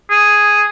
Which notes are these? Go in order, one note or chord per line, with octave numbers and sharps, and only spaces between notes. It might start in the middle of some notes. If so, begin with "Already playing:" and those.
G#4